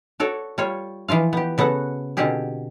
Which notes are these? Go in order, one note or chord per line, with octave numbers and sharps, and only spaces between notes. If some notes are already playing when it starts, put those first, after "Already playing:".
F#4 A4 C#5 D5
G3 F4 C#5
E3 F3 F4 F5
B3 G4
C#3 B3 F#4 A4 F#5
B2 D3 C4 F4 G4 G#4